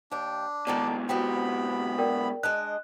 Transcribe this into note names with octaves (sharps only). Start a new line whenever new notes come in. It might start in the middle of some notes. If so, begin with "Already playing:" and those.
D#2 D4 G5
G#2 B2 D#3 A4 D5
B3 C4 F#4 G4 G5 B5
A#4 D5 G5
G#3 D4 D#5 F#6